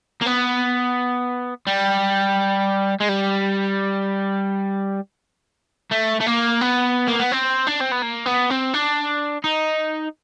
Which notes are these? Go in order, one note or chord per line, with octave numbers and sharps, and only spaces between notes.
A#3
B3
G3
G#3
G3
A3
A3
A#3
B3
A#3
B3
C4
D4
C4
B3
A#3
B3
C4
D4
D#4